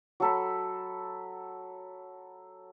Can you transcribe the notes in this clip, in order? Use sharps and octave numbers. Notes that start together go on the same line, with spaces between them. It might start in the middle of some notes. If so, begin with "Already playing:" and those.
F#3 A4 B5